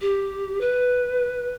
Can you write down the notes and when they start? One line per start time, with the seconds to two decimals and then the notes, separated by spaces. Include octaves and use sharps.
0.01 G4
0.61 B4